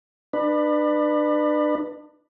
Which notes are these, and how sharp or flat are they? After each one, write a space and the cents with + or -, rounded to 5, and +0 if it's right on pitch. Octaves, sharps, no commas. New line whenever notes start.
D4 +35 B4 +0